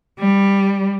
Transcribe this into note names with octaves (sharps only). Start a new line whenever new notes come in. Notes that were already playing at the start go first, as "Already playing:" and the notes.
G3